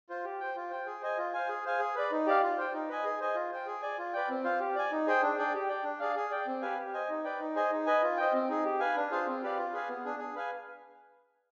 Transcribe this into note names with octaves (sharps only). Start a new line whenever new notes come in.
F4 C5
G4
C5 G5
F4
C5 G5
G#4
C5 D#5 G#5
F4
C5 F5 G#5
G#4
C5 F5 G#5
G#4
B4 D5
D#4
G4 D5 F5
F4
C5 G5
D#4
B4 D#5 G#5
G#4
C5 D#5 G#5
F4
C5 G5
G#4
D5 G#5
F4
B4 D5 G5
C4
F4 C5 F5
G4
D5 G#5
D#4
G#4 C5 G5
D4
G#4 D5 G5
G4
D5 G5
D4
G#4 D5 F5
G#4
D5 G5
C4
G4 B4 F5 G#5
G4
C5 D#5 G#5
D#4
B4 D5 G5
D#4
G#4 C5 D#5 G#5
D#4
B4 D#5 G#5
F4
C5 D#5 G5
C4
D#4 G#4
G4
B4 F5 G#5
D4
F4 G#4 C5 F5
C4
G4 B4 D5 F5
F4
G#4 B4 F5 G#5
B3
D4 G#4
G#4
B4 F5 G#5